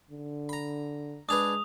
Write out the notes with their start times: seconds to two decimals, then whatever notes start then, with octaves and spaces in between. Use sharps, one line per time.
0.11 D3
0.49 A#5 B5
1.29 G#3 D4 G#4 B4 D#6 F7